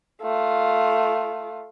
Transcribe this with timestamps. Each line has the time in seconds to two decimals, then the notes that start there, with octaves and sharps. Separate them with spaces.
0.22 A3 F4